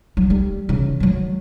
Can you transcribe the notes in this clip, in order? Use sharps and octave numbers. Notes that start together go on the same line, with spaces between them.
F#3
G3
C#3 E3
D#3 F#3